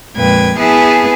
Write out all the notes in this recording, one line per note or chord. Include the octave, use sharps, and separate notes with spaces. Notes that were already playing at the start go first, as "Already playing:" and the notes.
F2 A#2 G#3 B4 G5 G#6
B3 E4 G#4 B4 G#5 A5